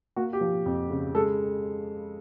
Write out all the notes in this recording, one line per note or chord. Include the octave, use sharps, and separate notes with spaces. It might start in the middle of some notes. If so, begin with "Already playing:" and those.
A#3 F#4
G4
F3
F2
C#3
G#3 A4